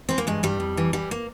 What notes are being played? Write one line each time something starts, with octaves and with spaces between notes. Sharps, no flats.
E3 C4
A#3
G2 G#3
G2 G3
F2
E3
E3 G3
A#3